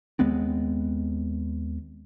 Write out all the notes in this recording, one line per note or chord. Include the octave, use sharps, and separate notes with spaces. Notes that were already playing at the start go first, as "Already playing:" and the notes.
D#2 G#3 B3 C4